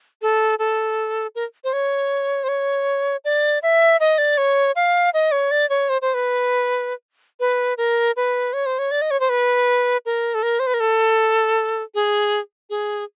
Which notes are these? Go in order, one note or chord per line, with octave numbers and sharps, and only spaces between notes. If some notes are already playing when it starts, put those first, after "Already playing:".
A4
A4
A#4
C5
C#5
C5
C#5
D5
E5
D#5
D5
C#5
F5
D#5
C#5
D5
C#5
C5
C5
B4
B4
A#4
B4
C#5
C5
C#5
D5
D#5
C#5
C5
B4
A#4
A4
A#4
C5
B4
A#4
A4
G#4
G#4